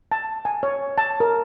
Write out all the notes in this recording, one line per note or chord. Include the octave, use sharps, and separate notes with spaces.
A5
G#5
C#5
A5
A#4